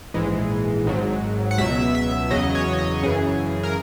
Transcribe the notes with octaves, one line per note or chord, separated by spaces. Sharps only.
A#1 G#2 E3 G#3
G#1 G#2 F#3
F#5
C#2 B2 F#3 E5
E5
E2 C#3 F#3 D#5
C#5
C#5
D#5
F#2 C#3 E3 G#4
A#4